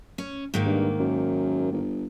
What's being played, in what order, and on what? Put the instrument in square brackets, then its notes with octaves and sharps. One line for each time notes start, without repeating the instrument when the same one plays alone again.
[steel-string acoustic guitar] C#4
G#2 D#3 A#3
[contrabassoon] G2
F#2
G1